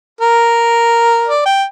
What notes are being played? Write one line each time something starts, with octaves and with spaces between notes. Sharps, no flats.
A#4
D5
G5